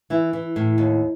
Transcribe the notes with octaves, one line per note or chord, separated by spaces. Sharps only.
E3 E4
E3
A2
D#2